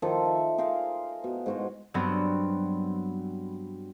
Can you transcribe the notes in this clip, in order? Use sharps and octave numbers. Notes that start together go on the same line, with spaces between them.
D#3 F3 A4
E5
G#4 A#4 C5 F5
B2
G#2 F#4 C5
G2 F#3 G3 B3 C4